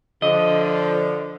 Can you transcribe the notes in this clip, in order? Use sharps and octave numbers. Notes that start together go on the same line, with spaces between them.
D3 F3 D#5